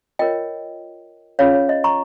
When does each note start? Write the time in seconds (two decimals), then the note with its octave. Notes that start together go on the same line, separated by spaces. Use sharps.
0.19 F4 A#4 C#5 D#5 G5
1.39 C#4 F4 G#4 C#5 F5
1.54 C#5
1.69 D#5
1.84 A#5 C#6